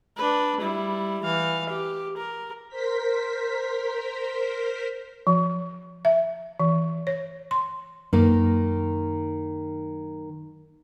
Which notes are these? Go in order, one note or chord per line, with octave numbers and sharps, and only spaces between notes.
D4 B4
G3 E4
E3 F5
G4
A#4
A#4 C5 B6
F3
E5
E3
C#5
C6
F#2 D#3 A#3